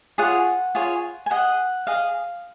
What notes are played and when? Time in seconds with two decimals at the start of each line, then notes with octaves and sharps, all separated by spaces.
0.18 F4 G#4 C#5 F#5
0.75 F4 G#4 C#5
1.26 G#5
1.31 G#4 D#5 F#5
1.87 G#4 D#5 F5